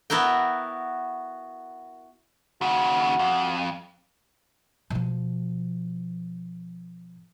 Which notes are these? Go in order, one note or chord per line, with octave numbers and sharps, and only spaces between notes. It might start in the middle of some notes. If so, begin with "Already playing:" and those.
B3 E4 F#4 A#4 G5
D#2 C#3 F#4
F2
B2 F3